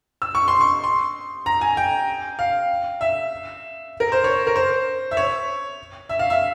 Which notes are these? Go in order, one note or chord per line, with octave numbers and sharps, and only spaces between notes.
E6
C#6
C6
C#6
C6
A#5
G#5
G5
F5
E5
A#4
C5
C#5
A#4
C5
E5
C#5
E5
F5
E5